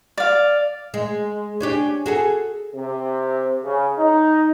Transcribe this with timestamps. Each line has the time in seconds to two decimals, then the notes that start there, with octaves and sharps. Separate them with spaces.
0.17 D5 F5
0.94 G#3
1.60 C#4 D4 G4
2.06 F#4 G#4 A4
2.75 C3
3.64 C#3
3.99 D#4